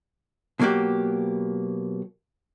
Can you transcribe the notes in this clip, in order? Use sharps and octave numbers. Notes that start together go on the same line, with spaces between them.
B2 F#3 A#3 F#4 G4